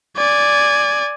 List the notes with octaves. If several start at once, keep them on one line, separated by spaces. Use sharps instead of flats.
D5 G#5